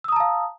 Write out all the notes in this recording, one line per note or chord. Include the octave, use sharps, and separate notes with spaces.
F5 A5 A#5 D#6 E6